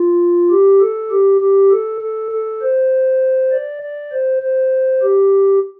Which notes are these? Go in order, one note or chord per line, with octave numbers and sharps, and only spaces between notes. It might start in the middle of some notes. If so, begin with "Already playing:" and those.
Already playing: F4
G4
A4
G4
G4
A4
A4
A4
C5
D5
D5
C5
C5
G4